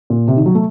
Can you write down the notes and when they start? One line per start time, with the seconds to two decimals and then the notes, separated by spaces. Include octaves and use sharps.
0.10 A#2
0.28 C3
0.37 D#3
0.46 F#3
0.55 A3